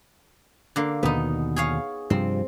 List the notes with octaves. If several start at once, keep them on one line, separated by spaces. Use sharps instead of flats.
D3 A#3
D#2 B2 D3 B3 D#4
G#4 C#5 F5
G2 C3 F3 C4